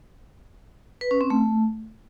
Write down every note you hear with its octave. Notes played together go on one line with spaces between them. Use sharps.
B4
C#4
C4
A3